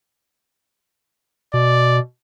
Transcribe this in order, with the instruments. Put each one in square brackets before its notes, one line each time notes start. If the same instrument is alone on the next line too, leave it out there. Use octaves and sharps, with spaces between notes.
[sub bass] B2 [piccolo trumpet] D5